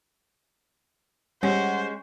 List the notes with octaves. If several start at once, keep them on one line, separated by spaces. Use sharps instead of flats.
G3 G#3 C#4 C5 F#5